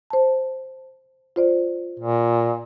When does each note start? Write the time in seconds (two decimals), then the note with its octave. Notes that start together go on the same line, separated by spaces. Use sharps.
0.10 C5 A5
1.36 F4 C5 D5
1.99 A#2